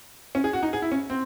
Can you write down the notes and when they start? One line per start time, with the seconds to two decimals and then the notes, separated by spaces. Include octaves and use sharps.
0.35 C#4
0.44 G#4
0.53 F#4
0.63 D#4
0.73 G#4
0.82 E4
0.92 C#4
1.10 C4